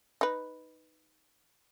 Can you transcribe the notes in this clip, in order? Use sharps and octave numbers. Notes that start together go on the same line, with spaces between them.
D#4 B4